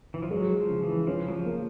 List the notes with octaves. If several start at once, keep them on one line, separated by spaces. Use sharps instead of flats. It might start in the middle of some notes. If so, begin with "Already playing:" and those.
E3
F3
F#3 G#3
F3
C#3
E3
F3 C#4
F#3
F3
A#3